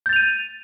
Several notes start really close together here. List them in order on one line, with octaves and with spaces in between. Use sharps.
G6 A6 F7 D#7